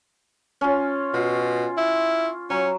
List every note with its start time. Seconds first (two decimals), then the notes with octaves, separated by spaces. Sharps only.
0.61 C#4 F4
1.14 B2 F4
1.78 E4
2.50 F#3 C#4